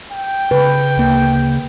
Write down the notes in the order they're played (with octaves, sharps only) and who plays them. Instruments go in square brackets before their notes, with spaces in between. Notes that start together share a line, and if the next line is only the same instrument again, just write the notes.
[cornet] G5
[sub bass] C#3 [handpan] B4
[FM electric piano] D2 A#3